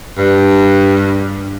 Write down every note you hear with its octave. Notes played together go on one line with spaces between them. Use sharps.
G2